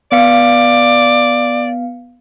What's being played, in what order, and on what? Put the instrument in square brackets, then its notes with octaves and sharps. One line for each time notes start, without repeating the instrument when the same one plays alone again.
[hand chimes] B3 F5 C#7 [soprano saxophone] D5